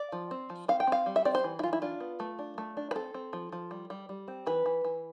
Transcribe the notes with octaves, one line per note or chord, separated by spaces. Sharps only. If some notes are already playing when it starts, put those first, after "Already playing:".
Already playing: D5
F3
C4
F3
C4 F5
G5
C4 F5
G3
E5
C4 D5
C5
E3
E4
E3 F4
E4
D4 F4
B3
A3
D4
A3
D4
B4
C4 A4
C4
F3
F3
G3
G3
G3
C4
E3 B4
E3
E3